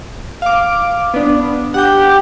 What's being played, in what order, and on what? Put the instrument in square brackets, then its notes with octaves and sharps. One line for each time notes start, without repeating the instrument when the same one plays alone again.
[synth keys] F5 D6
B3 D4
[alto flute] G4 [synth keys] F#5 G6